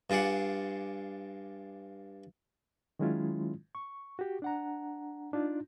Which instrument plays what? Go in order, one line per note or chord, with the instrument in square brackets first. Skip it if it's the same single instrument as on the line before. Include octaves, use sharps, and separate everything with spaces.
[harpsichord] G2 F4 G#4 D5 F#5
[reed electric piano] D#3 F#3 G#3 C#4 E4 F4
C#6
F#4 G4
D4 F#5 A#5
D4 D#4 F4